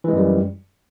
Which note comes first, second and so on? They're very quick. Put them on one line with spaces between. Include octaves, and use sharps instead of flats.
E3 G#3 F#2 G3